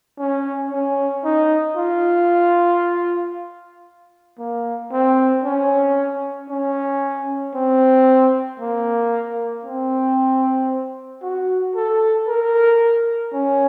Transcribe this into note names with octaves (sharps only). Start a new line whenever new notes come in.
C#4
C#4
D#4
F4
A#3
C4
C#4
C#4
C4
A#3
C4
F#4
A4
A#4
C#4